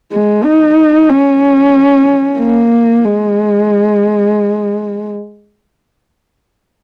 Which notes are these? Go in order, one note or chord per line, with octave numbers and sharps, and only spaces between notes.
G#3
D#4
C#4
A#3
G#3